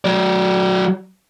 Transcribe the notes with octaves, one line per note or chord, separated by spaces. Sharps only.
F#3 D5